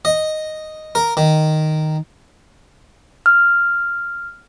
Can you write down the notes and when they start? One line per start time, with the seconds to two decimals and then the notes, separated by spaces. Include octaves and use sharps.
0.05 D#5
0.95 A#4
1.17 D#3
3.26 F6